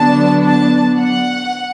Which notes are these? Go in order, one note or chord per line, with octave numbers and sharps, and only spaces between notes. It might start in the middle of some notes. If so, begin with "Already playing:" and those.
Already playing: D3 F#3 B3 D4 A5
A5
F#5